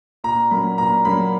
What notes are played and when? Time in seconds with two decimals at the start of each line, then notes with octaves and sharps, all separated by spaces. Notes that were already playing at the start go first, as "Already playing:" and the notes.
0.24 A#2 A#5
0.51 F#3 A#3 C#4 B5
0.78 A#2 A#5
1.05 F#3 A#3 C#4 B5